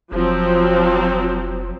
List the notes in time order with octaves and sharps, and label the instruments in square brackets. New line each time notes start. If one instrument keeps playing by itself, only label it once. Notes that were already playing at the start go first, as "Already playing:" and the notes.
[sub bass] F1 [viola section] F3 F#3 C4